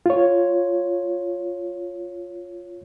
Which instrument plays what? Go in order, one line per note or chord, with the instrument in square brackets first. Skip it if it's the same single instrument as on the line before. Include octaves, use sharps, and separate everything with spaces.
[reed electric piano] F4 C#5